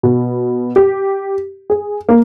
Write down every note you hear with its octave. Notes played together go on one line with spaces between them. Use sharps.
B2
G4
G#4
A#3